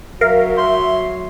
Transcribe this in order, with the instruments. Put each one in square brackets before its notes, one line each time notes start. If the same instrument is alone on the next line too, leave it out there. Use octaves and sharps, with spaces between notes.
[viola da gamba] F#3 [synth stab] A#4 F5 [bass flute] E5
[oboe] C6